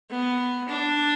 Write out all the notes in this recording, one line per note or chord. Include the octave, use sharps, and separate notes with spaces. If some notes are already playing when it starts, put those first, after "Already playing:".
B3
D4